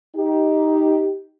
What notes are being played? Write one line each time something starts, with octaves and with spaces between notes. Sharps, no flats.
D#4 G4